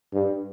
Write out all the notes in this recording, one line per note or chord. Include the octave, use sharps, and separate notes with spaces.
G2